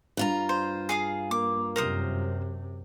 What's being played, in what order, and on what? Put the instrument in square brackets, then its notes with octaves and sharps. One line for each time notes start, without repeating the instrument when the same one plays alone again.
[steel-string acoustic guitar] G2 F4 A#5
[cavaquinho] C5
G#4 F5 D#6
[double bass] A#3 [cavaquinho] D6
[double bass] F#2 C3 [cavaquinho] A#4 C5 D#6